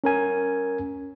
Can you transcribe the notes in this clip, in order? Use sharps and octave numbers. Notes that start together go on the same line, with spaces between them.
C#4 A#4 G#5